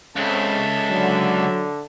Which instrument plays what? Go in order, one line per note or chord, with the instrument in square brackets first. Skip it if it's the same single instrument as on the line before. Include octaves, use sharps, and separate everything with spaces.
[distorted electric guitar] C#2 [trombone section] C#3 C4 [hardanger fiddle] A4 E5
[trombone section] D3 [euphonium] F#3